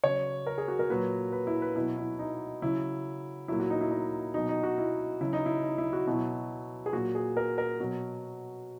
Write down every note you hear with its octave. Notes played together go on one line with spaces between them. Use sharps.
C#3 F#3 C#5
A#4
G#4
F#4
A#4
A#2 F#3 B4
B4
E4
B4
B2 F#3 E4
E4
D#4
C#3 F#3 E4
A#2 F#3 E4
F#4
D#4
E4
D#4
B2 F#3 D#4
D#4
F#4
E4
C#3 F#3 E4
D#4
E4
D#4
E4
F#4
B2 F#3 E4
G#4
A#2 F#3 F#4
G#4
A#4
A#4
B2 F#3